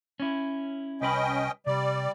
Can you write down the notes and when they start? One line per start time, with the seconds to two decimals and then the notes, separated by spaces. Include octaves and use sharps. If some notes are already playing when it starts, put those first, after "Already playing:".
0.20 C#4 E4
1.01 C2 C#4 B4 D#5 G5 B5
1.67 C3 G3 D5